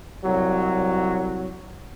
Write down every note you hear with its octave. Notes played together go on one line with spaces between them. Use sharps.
C2 F#3